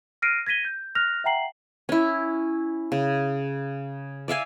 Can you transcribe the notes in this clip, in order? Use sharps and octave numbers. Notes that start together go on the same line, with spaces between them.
F6 F#6 A#6 C7 D7 D#7
G#6 A#6 B6 D#7 G7
G6
F6 F#6 A#6 F7
E5 F#5 G5 A#5 C7 F#7
C#4 E4
C#3
D5 E5 F5 G#5